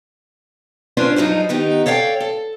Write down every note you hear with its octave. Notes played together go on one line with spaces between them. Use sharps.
C#4 D4 F4 B4 C5
G2 F3 F#3 D#4 F4
D#3 B3 D#4 G4
A4 C#5 D5 F5 G5
A4